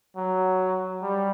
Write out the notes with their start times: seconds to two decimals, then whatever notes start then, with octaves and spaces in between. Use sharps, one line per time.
0.17 F#3
1.02 G3